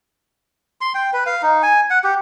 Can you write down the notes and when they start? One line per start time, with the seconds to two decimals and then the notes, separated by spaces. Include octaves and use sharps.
0.81 C6
0.95 G5
1.13 B4
1.26 F5
1.42 D#4
1.63 G#5
1.90 F#5
2.04 G4